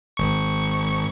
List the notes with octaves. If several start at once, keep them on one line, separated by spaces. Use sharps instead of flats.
G#1 C#6